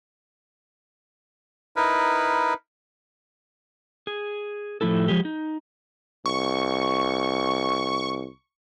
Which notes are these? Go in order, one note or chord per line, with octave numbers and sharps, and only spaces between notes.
D#4 E4 A#4 B4
G#4
A2 F3 A3 E4 A4
F3 G#3 G4
D#4
C2 C#6